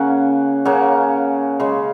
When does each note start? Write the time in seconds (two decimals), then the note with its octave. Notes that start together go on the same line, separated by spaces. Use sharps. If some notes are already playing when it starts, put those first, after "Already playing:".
Already playing: C#3 A#3 C#4 F#5
0.65 C#3 A#3 C#4 F#5
1.60 C#3 G#3 C#4